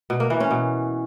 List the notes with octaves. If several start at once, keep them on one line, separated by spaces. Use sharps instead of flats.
B2
A#3
E3
C#4
B2